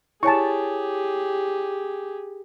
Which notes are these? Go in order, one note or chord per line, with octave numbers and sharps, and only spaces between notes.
E4 G4 G#4 C#5 G#5 A5 C#6